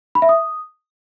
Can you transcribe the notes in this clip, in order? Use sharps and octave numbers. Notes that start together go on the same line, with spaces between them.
B5
E5
D#6